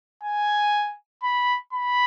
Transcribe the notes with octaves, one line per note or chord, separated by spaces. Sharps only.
G#5
B5
B5